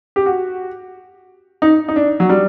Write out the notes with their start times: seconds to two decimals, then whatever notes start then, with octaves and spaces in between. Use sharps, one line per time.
0.16 G4
0.26 F#4
1.62 D#4
1.88 D#4
1.96 D4
2.20 F#3
2.29 G3